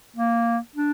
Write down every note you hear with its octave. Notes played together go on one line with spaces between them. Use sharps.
A#3
D4